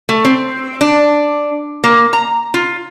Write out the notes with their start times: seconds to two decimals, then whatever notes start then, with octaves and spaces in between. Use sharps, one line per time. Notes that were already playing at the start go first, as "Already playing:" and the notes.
0.09 A3
0.25 C4
0.81 D4
1.84 A#3
2.13 A#5
2.54 F4